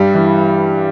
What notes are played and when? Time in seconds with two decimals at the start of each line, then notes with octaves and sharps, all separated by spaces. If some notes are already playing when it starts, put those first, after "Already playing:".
Already playing: G2 G3
0.14 E3